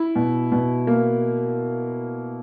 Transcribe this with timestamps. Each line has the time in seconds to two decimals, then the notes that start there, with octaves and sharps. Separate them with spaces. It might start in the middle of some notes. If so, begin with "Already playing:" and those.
Already playing: E4
0.15 B2
0.52 B2
0.87 A#3